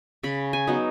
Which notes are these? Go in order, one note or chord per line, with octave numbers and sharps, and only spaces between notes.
C#3 B5
G#5
F#3 B3 D#4